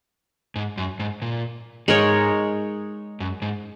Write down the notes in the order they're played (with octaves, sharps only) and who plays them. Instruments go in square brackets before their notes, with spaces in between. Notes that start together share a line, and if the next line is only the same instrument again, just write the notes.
[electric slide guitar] G#2
F#2
G#2
A#2
[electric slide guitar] G#2 [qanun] G#3 D#4 A#4 C#5
[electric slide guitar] F#2
G#2